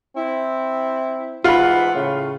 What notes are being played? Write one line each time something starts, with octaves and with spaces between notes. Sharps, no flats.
C4 E4
G#2 E3 F4 F#5 B5
A2 C#3